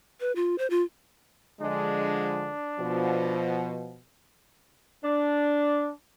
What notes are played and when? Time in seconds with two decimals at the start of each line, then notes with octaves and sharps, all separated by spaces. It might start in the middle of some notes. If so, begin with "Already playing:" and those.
0.20 B4
0.36 F4
0.58 C5
0.70 F4
1.61 D3 F3 G#3 D4
2.80 B2 F3
5.03 D4